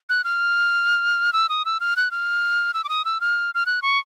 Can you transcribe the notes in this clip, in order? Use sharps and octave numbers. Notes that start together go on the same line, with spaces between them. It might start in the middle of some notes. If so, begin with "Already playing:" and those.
F#6
F6
E6
D#6
E6
F6
F#6
F6
E6
D6
D#6
E6
F6
F6
F#6
C#6